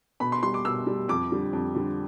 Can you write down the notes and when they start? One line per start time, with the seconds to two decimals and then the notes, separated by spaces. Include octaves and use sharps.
0.20 B2 B5
0.32 C6
0.43 G3 C6
0.54 D6
0.65 B2 E6
0.87 G3
1.08 F2 D6
1.31 D3 G3
1.53 F2
1.75 D3 G3